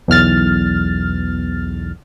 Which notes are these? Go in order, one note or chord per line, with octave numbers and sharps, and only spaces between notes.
B1 E2 F6 A6